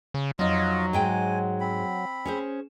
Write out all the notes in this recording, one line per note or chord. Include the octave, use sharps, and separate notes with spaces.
C#3
F2 F#3 D#4 F4 D#5
G#2 G#3 G5 G#5
C4 B5
C#4 G#4 C5